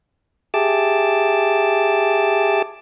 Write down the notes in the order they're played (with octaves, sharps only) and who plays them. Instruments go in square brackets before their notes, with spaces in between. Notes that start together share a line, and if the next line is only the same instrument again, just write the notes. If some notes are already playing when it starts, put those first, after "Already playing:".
[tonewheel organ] G4 G#4 E5 A5 D6